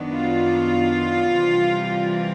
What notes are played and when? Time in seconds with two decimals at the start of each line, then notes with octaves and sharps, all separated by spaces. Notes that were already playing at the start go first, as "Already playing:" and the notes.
Already playing: F#2 D#3 F#3 B3 D4
0.15 F4
1.36 C3 E3 G3 C4